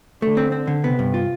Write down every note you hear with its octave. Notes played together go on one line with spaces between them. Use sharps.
D3 A3
C4
C4
D3
C3 B3
G2
F4